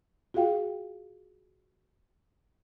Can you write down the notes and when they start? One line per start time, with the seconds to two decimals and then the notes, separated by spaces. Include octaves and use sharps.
0.34 F4 F#4 G#4 F5 G5